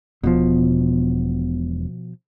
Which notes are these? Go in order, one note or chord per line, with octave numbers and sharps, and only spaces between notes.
E1 B2 F3 B3